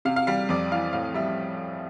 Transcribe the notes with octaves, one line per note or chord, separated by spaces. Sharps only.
C3 F5
F5
G3 F5
F2 D5
E3 F5
A2 F5
G3 E5